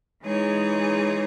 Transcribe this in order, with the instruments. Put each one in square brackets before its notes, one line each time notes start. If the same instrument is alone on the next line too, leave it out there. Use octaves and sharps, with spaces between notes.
[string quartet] E3 G#3 D#4 G#4 C#5